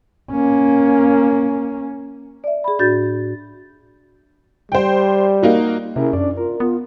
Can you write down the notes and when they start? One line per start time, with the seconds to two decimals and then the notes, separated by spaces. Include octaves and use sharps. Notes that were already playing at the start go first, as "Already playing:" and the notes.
0.32 A#3 C#4
2.44 D5 E5
2.64 G#4 B5
2.79 A2 D4 F#4 G6 A6
4.72 G3 C5 G5
5.43 A#3 D#4 F#4
5.96 C3 C#4 E4 G#4 A#4
6.13 F#2 D4 D5
6.37 F4 A#4
6.60 B3 F4